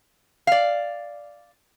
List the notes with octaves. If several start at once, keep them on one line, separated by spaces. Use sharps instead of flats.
D5 F5